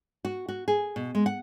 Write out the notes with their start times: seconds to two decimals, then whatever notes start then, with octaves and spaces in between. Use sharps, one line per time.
0.25 F#4
0.48 F#4
0.68 G#4
0.96 B2
1.15 G#3
1.26 F#5